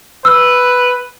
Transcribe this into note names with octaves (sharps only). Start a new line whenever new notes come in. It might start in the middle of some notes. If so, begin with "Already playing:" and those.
B4 E6 F6